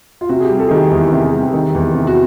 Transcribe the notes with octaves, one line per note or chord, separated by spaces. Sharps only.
F4
C3 F#4
G#4
G3 G4
A4
D#3 G#4
G4
E2 E4
C3
G3
D#3
E2
C3
F#4